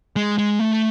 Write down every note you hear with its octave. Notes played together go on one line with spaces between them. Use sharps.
G#3
G#3
A3